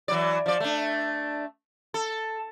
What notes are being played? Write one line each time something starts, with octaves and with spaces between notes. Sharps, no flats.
E3 F#3 D5
F3 D5
A3 D4
A4